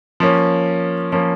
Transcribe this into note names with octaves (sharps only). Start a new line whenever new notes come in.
F3 A#3 C#4
F3 A#3 C#4